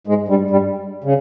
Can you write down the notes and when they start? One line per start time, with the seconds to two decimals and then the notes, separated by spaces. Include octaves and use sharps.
0.07 G#2 G#3
0.28 G2 G3
0.50 G2 G3
1.04 C#3